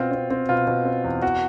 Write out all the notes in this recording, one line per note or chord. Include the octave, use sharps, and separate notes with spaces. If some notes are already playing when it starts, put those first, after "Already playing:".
Already playing: B2 C4 F4
C4
C4
B2 F4
B2
C4
E2
E2 F#4